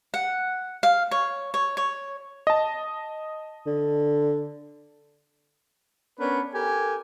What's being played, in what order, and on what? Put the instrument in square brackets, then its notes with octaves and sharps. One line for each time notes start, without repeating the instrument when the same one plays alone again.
[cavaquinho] F#5
F5
C#5
C#5
C#5
[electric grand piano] D#5 A5
[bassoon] D3
[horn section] B3 C#4 D4 A#4 B4 C#5
G4 A4 A#4 G#5